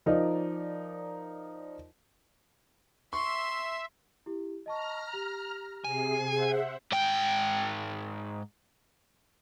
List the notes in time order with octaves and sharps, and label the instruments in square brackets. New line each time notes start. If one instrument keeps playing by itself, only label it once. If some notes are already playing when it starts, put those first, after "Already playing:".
[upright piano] F3 D#4 A#4 D5
[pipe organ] E5 [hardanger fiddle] C6 [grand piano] C#6
[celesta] E4 G4
[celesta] D#5 A5 C#6 [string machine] A#5 F6
[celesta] G4
[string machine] C3 G#4 C7 [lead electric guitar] G#5
[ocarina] G#4 [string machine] C5 E5 F#5
[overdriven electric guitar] G#2 G5